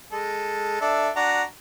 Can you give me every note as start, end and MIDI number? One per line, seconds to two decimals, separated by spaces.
0.12 0.79 56
0.12 0.79 69
0.81 1.10 62
0.81 1.10 69
0.81 1.10 76
1.16 1.42 62
1.16 1.42 66
1.16 1.42 82